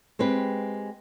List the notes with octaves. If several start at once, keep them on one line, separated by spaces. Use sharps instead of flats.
G#3 C4 G4 B4